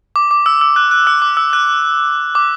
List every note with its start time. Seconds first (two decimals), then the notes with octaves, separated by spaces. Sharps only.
0.16 D6
0.31 D6
0.46 E6
0.61 E6
0.76 F#6
0.91 F#6
1.07 E6
1.22 D6
1.37 E6
1.53 F#6
2.35 D6